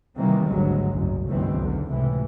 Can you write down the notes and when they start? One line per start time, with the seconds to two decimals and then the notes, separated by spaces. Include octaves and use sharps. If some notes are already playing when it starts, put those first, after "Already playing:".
0.15 C3 D#3 E3 G3 A#3 C4
0.46 G#1 D2 G2 D3 F#3 G#3
0.90 F#1 C2 F#2
1.25 F#1 C#2 G2 D#3 E3 C4
1.59 B1 E2 D3
1.89 C#2 A2 C3 E3